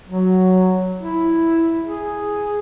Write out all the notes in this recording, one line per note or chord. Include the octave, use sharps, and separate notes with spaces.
F#3
E4
G#4